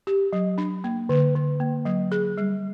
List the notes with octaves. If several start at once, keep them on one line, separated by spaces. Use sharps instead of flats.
G4
F#3
D4
A#3
D3
D3
A#3
F#3
G#4
G3